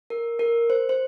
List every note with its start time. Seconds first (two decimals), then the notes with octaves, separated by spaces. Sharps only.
0.10 A#4
0.39 A#4
0.70 C5
0.89 C5